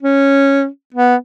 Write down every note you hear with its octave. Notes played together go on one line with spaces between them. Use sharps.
C#4
B3